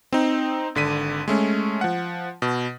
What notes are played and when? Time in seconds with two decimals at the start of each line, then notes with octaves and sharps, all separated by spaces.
0.13 C4 D#4
0.75 G#1 D3 B6 D#7
1.28 G#3 A3 C#4
1.81 F3 F#5
2.42 B2